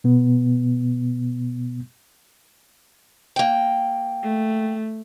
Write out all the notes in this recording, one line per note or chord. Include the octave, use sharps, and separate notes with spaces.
B2 B3
A#3 G5
A3